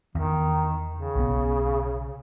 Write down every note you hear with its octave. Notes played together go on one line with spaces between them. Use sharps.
E2 D#3
C#3
B1 B2 B3